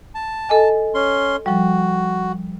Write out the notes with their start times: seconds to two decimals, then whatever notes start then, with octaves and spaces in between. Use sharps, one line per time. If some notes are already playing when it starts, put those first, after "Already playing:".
0.15 A5
0.49 A4 D#5 G#5
0.94 C#4 C6
1.46 F3 G3 F#4